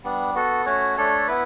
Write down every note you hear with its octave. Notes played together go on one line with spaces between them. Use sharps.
G3 B3 D4
B3 F#4 A4
A3 C#4 F#4 C#5
A3 D4 A4 C#5
B3 E4 B4